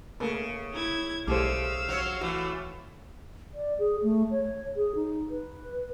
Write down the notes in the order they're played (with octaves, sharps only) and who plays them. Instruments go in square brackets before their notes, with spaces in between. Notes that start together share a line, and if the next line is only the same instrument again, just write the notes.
[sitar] C#3 [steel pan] A3 A#3
[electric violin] E4 G#6
[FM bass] B1 [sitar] C#3 [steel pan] G3 A3 C5 [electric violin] F5 E6
[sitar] F#3 C#5
[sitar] E3 A3 [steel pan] F#4
[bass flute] D5
G#4
A3
C#5
G#4
D#4
B4